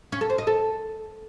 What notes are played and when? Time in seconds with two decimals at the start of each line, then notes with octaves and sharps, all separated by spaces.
0.12 C#4
0.21 A4
0.30 C5
0.38 D#5
0.47 A4